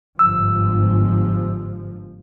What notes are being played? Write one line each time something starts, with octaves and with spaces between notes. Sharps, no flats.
G1 G#2 F3 E6